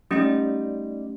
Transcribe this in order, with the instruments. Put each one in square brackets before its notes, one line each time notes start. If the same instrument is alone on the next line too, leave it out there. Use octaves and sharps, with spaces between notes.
[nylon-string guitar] G3 D#4 [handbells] A3 C#4 G4